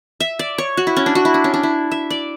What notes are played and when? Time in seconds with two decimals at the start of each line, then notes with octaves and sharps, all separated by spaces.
0.20 E5
0.39 D5
0.58 C#5
0.77 F#4
0.87 E4
0.97 C#4
1.06 D4
1.15 F#4
1.25 E4
1.34 D4
1.44 C#4
1.54 D4
1.63 E4
1.92 E5
2.10 D5